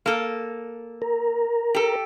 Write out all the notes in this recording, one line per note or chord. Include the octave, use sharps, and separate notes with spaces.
A#3 A4
A#4
G4 A4